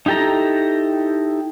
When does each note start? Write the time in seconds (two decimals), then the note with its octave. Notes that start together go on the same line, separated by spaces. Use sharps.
0.06 D#4 E4 G4 A4 A#5